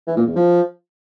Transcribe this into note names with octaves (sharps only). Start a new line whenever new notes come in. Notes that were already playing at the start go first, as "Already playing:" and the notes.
E3
A#2
E2
F3